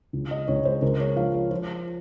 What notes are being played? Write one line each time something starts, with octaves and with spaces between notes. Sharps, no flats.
C#2
D#5
C#2 C#5
C5
C#2 A#4
C#5
F3 F5
C#5
F3 C5